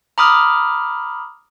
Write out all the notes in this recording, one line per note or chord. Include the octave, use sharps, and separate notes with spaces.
A#5 B5 D6 D#6 F6